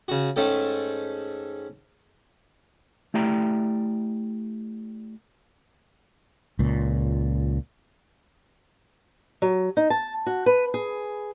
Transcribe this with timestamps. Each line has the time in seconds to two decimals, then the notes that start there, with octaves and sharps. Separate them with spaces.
0.08 C#3 F#4
0.36 G#2 A3 C#4 A4 G5
3.14 A3 E4 G4 D5 G5 A#5
6.59 C#2 A#2
9.42 F#3
9.77 D#4
9.90 A5
10.26 F#4
10.46 B4
10.74 G#4